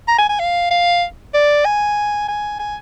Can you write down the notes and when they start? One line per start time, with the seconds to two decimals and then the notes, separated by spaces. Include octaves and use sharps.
0.08 A#5
0.18 G#5
0.29 G#5
0.40 F5
0.71 F5
1.34 D5
1.65 G#5
2.28 G#5
2.59 G#5